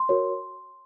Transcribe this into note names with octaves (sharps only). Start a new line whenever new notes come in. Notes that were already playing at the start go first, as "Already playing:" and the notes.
Already playing: C6
F#4 A#4 C#5